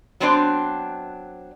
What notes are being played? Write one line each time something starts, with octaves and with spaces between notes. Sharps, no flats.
F#3 B3 C4 D4 C5 D5